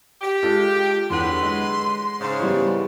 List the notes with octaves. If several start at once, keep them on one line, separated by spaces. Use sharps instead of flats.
G4
G#3 F4 A4
E2 D3 F#3 B4 C6
G#3
G#2 C#3
E3 G3 B3